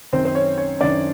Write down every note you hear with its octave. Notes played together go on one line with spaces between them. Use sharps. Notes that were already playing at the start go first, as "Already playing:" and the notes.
F#2 D#3 C4 C5
C5
C#4 C#5
C#4 C#5
F#2 D#3 D4 D5